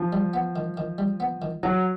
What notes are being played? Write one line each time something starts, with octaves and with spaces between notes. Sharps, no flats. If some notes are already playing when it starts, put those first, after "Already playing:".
Already playing: F3
G3
B3
D#3
D#3
G3
B3
D#3
C#3 F#3